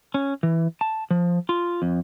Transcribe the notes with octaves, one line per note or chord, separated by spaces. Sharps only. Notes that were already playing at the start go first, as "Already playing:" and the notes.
C#4
E3
A5
F3
F4
F2